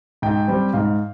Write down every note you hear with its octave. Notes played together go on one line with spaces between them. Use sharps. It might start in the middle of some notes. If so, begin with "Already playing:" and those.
G#2 G5
G3 C4
G#2 F5